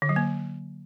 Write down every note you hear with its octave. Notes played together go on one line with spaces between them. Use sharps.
D3
F#3
A#3